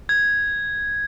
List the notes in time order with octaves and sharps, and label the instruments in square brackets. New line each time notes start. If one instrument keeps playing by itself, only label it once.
[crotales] G#6